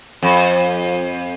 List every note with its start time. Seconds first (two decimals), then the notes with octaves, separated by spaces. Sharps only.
0.23 F2